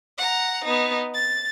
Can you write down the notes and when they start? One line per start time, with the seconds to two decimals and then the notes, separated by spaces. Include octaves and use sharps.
0.18 F#5 A#5
0.65 B3 D#4
1.14 A6